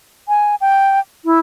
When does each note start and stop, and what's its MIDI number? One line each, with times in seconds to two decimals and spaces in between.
0.28 0.55 80
0.61 1.00 79
1.25 1.39 64